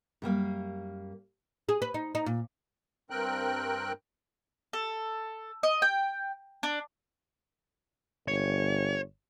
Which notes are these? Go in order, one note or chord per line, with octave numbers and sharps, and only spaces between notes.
F#2 G3 A#3 F5
G#4
B4
D#4
D#4
A#2
G2 C4 A#4 G5 F#6
A4
D#5
G5
D4
G1 C#5